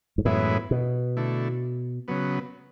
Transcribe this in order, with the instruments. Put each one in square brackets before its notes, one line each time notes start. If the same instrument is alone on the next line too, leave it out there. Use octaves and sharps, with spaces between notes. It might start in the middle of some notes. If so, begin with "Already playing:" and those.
[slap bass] G#2
[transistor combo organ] F#2 E3 G#3 B3 E4 [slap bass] A2
[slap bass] B2
[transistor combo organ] D3 A3 E4
C#3 F#3 B3